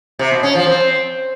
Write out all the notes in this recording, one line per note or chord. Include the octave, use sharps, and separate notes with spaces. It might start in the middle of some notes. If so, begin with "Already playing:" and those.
C3
B2
C#4
F3
C4